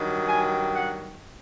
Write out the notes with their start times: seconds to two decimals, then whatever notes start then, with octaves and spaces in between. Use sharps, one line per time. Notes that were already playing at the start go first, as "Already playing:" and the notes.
Already playing: G2 D#3 F#3
0.28 G#5
0.74 F#5